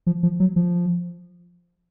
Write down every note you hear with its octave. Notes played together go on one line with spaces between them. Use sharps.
F3
F3
F#3
F3